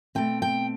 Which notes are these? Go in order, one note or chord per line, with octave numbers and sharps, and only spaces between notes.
B2 A3 C4 G5
G5